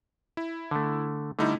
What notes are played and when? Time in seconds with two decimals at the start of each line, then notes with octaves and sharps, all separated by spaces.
0.37 E4
0.71 D3 A3
1.39 D3 G3 A3 D#4 E4